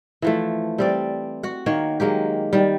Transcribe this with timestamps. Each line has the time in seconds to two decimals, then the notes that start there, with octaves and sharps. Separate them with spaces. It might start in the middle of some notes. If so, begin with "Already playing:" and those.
0.22 E3 F3 A3
0.78 G3 C4 D5
1.43 F#4 F#5
1.66 D#3 A#3 C#5
2.00 F#3 G#3 A#3 G4
2.53 D#3 G3